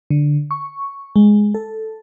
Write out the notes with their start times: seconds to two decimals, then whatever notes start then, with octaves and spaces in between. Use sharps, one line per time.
0.10 D3
0.51 C#6
1.16 G#3
1.54 A4